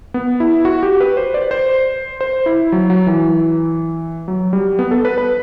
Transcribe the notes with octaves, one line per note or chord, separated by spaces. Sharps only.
B3
E4
F#4
G4
B4
C5
D5
C5
C5
E4
F#3
F#3
E3
F#3
G3
B3
A4
B4
B4